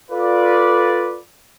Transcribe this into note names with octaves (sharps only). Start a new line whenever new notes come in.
F4 A4 B4 D5